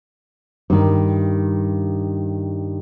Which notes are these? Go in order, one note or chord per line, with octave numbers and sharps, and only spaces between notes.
G2 D#3